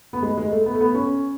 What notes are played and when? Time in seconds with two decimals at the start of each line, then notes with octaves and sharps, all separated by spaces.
0.13 B3
0.23 G#3
0.37 G#3
0.52 A3
0.66 B3
0.73 A3
0.80 B3
0.94 C#4